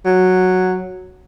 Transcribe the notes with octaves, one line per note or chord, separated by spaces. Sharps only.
F#3